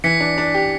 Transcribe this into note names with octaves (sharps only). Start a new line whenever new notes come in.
E3 B6 C#7
D4
D4
G4